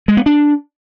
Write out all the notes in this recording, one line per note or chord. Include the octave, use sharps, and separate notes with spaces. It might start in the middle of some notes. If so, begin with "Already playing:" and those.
G#3
B3
D4